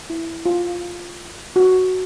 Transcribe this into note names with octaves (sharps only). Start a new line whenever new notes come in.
E4
F4
F#4